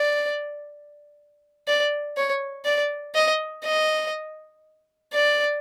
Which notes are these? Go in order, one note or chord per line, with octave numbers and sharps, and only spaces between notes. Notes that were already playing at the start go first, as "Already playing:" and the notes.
Already playing: D5
D5
C#5
D5
D#5
D#5
D5